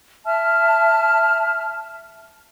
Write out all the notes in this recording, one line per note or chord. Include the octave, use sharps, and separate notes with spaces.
E5 A5 F6